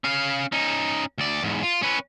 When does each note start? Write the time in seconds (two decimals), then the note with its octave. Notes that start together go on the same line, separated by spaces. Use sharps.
0.04 C#4 F5
0.52 C#4 D#4
1.18 D2 D5
1.42 E2 G#2
1.63 F4
1.82 C#4 B4